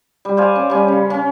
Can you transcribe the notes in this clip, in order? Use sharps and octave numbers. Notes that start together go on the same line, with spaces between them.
G3
C5 D5 F5 G#5
C#4
G3 C#4
C#3
C#4